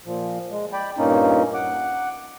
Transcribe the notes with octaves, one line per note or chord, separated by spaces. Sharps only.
A#2 F3
G#3
D5 G5 B5
G2 A#2 A#3 C#4 D#4
F#5 D6